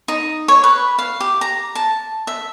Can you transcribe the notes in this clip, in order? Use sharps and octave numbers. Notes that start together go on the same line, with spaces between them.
D#4
C#5
B4
F5
G4
A#5
A5
E5